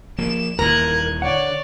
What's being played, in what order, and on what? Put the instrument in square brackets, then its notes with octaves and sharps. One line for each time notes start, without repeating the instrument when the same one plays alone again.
[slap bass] F3 A#3 [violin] E7
[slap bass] D#1 D#2 E3 [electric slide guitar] A#4 [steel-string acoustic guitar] A#5 [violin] F#6 G#6
[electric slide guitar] D3 F#5 [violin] C#5 D5